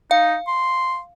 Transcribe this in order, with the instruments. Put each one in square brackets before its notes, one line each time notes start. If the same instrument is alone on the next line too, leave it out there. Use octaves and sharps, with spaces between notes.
[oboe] D#4 [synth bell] F5
[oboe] C6